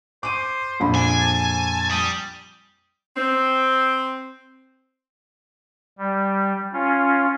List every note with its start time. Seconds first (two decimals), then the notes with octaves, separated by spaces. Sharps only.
0.23 C5 D6 D#7
0.80 A#1 F2 B5
0.95 D4 G#5
1.21 A5
1.90 G3 D#6
3.17 C4
5.98 G3
6.73 C#4 F4